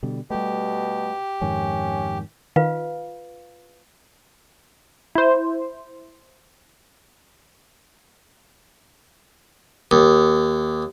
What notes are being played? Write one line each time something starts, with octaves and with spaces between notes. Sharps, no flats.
B2 D3 G3
B2 G3 A3 G4
F2 G#2 D#3 C#4
D#3 F4 B4 F5
E4 C5
D#2